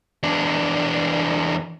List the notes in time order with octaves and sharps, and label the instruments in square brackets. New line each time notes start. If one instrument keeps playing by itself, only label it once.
[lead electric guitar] E2 D4